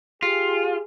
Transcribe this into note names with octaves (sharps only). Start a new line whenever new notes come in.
F4 G4 G#4